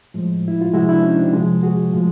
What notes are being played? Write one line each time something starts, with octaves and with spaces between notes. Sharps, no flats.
A2 F3 G#3
E4
F4
C3 F3 G#3 E4 F#4
D4 E4
C#4 D#4
C4 D4
C3 F3 G#3
F#4 G#4
A2 F3 G#3